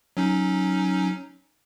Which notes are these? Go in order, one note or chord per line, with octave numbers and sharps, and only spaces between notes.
F#3 C#4 D#4